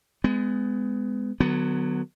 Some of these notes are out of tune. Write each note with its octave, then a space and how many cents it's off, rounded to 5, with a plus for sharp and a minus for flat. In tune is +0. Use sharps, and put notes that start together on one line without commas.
G#3 +0 B3 +30
D3 +40 F#3 +0 B3 +10